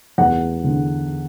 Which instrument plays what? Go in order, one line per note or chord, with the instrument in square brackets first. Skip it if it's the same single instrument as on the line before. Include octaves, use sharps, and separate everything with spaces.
[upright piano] E2 F#5
D3